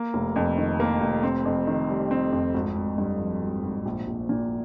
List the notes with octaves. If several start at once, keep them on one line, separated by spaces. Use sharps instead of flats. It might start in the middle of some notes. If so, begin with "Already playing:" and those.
Already playing: A#3
F1
F2
D#3
A#3
F1
C4
F2
D#3
G3
C4
F2
G#1
G#1
G2
F3
G#1
G#1
A#1
A#1
A#2